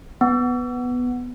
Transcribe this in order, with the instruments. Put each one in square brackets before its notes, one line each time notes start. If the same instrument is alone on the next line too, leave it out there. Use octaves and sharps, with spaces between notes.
[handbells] B3